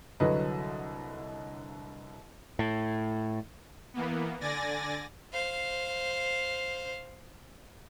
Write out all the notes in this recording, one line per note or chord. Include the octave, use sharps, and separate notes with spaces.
C2 D3 F#3 B4 D#5
A2
E3 A#3 B3
D3 D5 G#5 A6 A#6
C5 F5